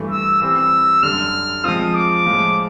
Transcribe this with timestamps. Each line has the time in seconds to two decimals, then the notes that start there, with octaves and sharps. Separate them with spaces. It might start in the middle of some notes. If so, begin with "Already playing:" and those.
Already playing: G2 E3 A3
0.10 E6
0.41 E3 G3 C4 E6
1.03 F#2 D3 G3 F6
1.64 F3 G#3 C4 F4 D#6
1.95 D6
2.26 A2 F3 G#3